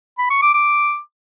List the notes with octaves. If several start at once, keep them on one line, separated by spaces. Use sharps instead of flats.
B5
C#6
D6
D6